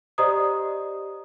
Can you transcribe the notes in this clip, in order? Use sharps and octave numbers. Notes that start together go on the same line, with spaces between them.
G4 C5 D5 D#5 A#5 D#6